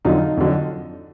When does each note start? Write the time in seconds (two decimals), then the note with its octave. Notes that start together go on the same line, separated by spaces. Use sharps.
0.05 F2 D3 F#3 D#4 F4
0.37 F2 D3 F#3